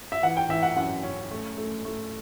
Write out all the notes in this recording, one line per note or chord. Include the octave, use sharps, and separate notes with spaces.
E5
E3 F#5
G5
E3 E5
F#5
F#2 F#5
C#4
A3
A3
A3